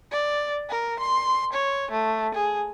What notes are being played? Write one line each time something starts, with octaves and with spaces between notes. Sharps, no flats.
D5
A#4
C6
C#5
A3
G#4